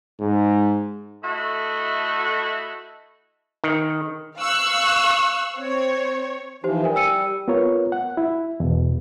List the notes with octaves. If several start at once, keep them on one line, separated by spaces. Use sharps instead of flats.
G#2
A3 E4 F#4 A4 D#5
D#3
F5 C#6 E6 F#6
C4 C#5
E3 F3 D#4 G4 C5
G3 A#4 G#5
E6 C#7 D#7
B3 F4 A#4 C#5
F#5
E4
E2 B2